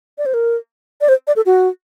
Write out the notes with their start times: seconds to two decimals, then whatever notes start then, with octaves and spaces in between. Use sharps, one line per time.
0.18 D5
0.26 C5
0.34 A#4
1.01 D5
1.09 C5
1.27 D5
1.36 A4
1.46 F#4